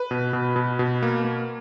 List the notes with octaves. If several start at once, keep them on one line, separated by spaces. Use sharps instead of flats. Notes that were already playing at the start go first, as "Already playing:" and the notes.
Already playing: B4
B2
B2
B2
B2
A#3
A#3